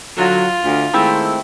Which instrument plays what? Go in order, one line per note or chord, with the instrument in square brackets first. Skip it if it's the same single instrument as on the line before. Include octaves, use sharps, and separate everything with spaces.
[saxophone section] D3 F#3 [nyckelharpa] F4
[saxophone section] D2
[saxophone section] D#3 G#3 A3 [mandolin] C4 E4